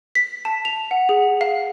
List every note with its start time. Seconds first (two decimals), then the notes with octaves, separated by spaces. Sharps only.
0.15 B6
0.45 A5
0.65 F7
0.91 F#5
1.09 G#4
1.41 F5